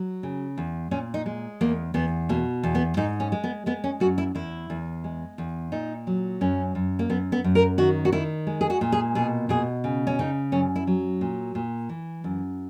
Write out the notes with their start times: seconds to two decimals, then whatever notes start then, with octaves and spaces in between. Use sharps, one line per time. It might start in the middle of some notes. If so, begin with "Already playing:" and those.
Already playing: F#3
0.23 C#3
0.58 E2
0.91 A#2 C#4
1.14 D#4
1.26 G#3
1.61 E2 A#3
1.94 E2 B3
2.29 B2 A#3
2.63 E2
2.75 B3
2.97 G#2 D#4
3.20 C#4
3.32 G#3
3.44 B3
3.66 G#3 B3
3.84 C#4
4.00 F#2 F#4
4.18 E4
4.35 E2 E4
4.70 E2
5.04 G#3
5.38 E2
5.72 A#2 D#4
6.07 F#3
6.41 F#2 C#4
6.75 F#2
6.99 A#3
7.10 F#2 B3
7.32 B3
7.44 F#2
7.55 A#4
7.78 D#3 F#4
8.05 F#4
8.12 D#3 E4
8.47 G#3
8.61 G#4
8.70 F#4
8.81 A#2
8.92 G#4
9.15 B2 G#4
9.49 B2 G#4
9.84 C#3
10.07 C#4
10.19 C#3 D#4
10.52 F#2 C#4
10.76 E4
10.87 F#3
11.21 A#2
11.55 A#2
11.89 E3
12.24 F#2